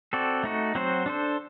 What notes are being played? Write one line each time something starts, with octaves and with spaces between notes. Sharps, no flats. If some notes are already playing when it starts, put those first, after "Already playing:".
C4 F#4 A4 D5
A3 D#4 F#4
F#3 C4 F#4 C5
D4 A4 C5